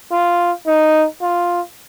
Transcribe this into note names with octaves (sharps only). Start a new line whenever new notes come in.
F4
D#4
F4